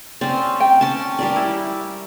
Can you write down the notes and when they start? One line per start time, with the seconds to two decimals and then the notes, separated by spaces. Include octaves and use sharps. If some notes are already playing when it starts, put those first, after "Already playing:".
0.21 C4 C#4 D5
0.60 G5
0.81 C#4 A5
1.19 G3 A#4 D5
1.36 E4